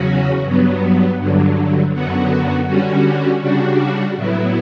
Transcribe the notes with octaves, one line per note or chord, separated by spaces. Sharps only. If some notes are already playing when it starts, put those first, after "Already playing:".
Already playing: E2 C#3 F#3 C#4 F#4
G2 F#3 B3
G2 D3 F#3
F#2 D3 F#3 B3 F#4
D3 G3 C#4 F#4
C#3 G3 D4 F#4
A2 F#3 B3 E4